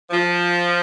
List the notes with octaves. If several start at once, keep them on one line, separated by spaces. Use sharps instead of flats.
F3